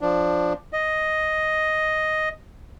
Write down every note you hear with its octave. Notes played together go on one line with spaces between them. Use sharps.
F3 D4
D#5